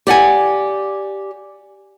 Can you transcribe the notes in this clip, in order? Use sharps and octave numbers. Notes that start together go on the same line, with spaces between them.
G4 D5 F#5 G#5